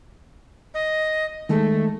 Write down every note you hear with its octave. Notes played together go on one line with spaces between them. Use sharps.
D#5
D#3 G#3 A3 A4